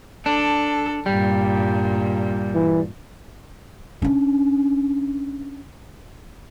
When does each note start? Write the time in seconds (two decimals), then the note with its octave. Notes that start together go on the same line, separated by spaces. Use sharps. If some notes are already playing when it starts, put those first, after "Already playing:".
0.26 D4 A4
1.06 G2 A#2 G3
2.54 E3
4.02 C#4 D4